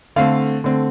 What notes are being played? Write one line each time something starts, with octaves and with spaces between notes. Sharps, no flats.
D3 A3 C4 F5
D3 A3 C4